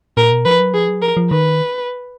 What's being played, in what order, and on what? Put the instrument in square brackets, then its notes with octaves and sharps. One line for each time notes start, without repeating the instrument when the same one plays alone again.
[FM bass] A#2 [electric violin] A#4
[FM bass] B2
[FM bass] F3 [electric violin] B4
[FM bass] F#3
[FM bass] F3 [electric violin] G#4
[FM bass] F#3
[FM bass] F3 [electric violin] A#4
[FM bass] F3
[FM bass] D#3 [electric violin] B4